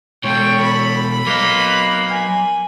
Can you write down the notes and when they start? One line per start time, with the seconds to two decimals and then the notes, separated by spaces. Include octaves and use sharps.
0.24 B2 G#3 A4 C#5 G5
0.63 B5
1.27 F#3 A#3 B4 D#5
2.08 G#5